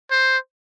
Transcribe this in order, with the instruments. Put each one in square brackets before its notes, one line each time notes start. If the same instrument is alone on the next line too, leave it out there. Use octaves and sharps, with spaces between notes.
[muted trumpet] C5